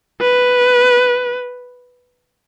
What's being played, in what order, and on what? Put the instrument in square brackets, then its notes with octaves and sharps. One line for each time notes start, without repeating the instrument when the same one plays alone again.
[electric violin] B4